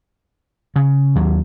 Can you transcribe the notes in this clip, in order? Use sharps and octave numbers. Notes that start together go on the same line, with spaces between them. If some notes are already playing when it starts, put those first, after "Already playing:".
C#3
D#2 F#3